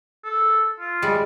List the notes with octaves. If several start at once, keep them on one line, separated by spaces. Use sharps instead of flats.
A4
F4
G3 G#3 D5